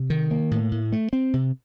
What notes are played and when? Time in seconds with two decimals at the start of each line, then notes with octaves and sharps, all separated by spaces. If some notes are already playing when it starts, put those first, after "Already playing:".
Already playing: C3
0.10 D#3
0.31 A#3
0.51 A2
0.72 A2
0.92 A3
1.13 C4
1.33 C3